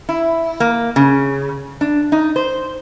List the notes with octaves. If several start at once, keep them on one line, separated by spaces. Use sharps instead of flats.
E4
A#3
C#3
D4
D#4
C5